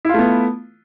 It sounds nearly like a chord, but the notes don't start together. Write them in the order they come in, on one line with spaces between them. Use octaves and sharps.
E4 F4 A3 B3